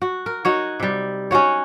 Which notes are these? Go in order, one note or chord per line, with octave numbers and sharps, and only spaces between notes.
F#4
A#4
D#4 F#4 C#5
C3 G3
C#4 D#4 F#4 C#5